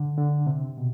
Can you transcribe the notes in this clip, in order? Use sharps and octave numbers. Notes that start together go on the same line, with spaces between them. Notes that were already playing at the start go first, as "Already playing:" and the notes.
Already playing: D3
D3
C3
B2